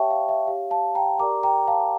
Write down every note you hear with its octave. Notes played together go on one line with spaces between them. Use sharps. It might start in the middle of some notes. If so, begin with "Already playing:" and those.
Already playing: G4 C#5 E5 G5 A5 C#6
F5
E5
G4 C#5 F5
F5 A5
G5 A#5
G4 A#4 D5 A#5 D6
G5 A#5
F5 A5